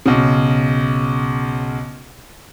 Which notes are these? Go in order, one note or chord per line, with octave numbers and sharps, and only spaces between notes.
B1 C#3